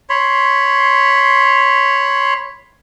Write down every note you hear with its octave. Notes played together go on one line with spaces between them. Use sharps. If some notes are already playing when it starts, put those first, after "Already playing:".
C#5 B5 C6